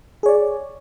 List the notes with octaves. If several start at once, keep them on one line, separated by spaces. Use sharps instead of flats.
G#4 C#5 D5